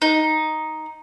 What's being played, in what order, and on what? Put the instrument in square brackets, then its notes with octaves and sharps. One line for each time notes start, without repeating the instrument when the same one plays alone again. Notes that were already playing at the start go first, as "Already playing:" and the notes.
[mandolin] D#4